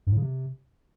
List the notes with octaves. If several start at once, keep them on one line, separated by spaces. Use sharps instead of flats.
G2
A2
C#3
C3